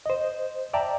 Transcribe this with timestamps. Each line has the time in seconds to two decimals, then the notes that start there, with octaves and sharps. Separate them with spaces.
0.06 C5 D#5
0.73 D5 E5 G5 A5 A#5